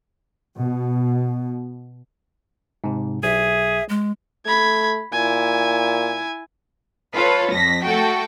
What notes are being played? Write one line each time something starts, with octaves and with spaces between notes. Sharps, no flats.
B2
G#2 C3
B1 G#4 E5
G#3
A3 B5 G#6
A#2 E4 G#5
F4 A4 B4 C#5
F2 A#6 B6
A3 F#4 A4 G5